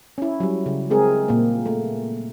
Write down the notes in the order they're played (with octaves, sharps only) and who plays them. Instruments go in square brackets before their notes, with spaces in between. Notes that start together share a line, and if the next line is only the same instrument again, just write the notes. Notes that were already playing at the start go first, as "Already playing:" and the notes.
[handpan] C#4 E4
F#3 G3
C#3
G#3 C4 G#4 A#4
A#2 A#3
A3